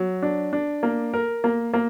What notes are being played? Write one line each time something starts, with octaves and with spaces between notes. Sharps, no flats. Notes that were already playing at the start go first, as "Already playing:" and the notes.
Already playing: F#3
D4
D4
A#3
A#4
A#3
A#3